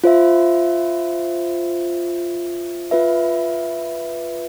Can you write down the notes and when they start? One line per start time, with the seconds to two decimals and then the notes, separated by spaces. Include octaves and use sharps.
0.04 F4 C5 E5
2.91 F4 B4 E5